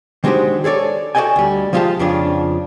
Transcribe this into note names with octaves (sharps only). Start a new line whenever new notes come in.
D#3 G#3 D4 F#4 G4 C5
G#4 A4 C#5 D5
F#4 A4 D5 D#5 G5 G#5
D2 G3
F3 G#3 F4 G4 F5 A5
F2 C#3 F3 D4 F4